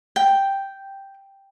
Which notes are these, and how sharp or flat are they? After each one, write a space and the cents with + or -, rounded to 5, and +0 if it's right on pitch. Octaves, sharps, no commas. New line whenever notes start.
G5 +0